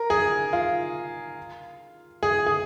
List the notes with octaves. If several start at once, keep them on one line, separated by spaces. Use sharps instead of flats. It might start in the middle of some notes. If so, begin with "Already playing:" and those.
Already playing: A#4
G#4
F4
G#4
G#4